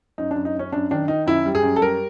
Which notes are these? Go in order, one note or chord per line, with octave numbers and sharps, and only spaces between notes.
F#2 D#4
F#2 D4
D#4
F#2 C#4
F#2 D4
D#3 D4
D#3 D#4
F#2 E4
G3
G#4
F#2
A4
G3 A#4